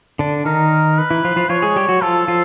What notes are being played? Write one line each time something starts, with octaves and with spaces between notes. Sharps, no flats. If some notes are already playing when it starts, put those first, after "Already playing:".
D3 D4
D#3 D#4 A#4
B4
E3 E4
F3 F4
F3 F4
F3 F4 C#5
G#3 G#4
G3 G4
F#3 F#4
F3 F4 A4
F3 F4